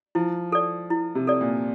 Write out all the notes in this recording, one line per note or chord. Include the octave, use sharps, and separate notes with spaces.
F3 E4
A4 D5
E4
C3
A4 D5
A#2